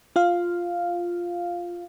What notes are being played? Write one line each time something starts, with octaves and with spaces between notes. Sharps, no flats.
F4 F5